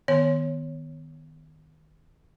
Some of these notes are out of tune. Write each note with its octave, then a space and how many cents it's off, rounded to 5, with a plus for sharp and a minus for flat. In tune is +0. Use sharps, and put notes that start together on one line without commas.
D#3 +0 B3 +0 C#5 +0